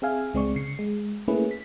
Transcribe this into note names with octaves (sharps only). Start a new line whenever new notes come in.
C4 G#4 E5 F5 G#5
C#2 G#3 C4 D5 C#6
C#3 C7 C#7
G#3
A3 A#3 C#4 E4 G#4 B4
B6